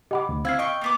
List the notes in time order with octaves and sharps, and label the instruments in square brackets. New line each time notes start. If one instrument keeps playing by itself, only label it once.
[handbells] G4 F#5 D6 [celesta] D#5 B5
[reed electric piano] D2
[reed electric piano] C4 [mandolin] E4 E5 [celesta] F5 F6 [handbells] E6 G#6 C7
[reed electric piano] D#5 [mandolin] G5 C#6 [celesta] D7
[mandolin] A#3 B3 D6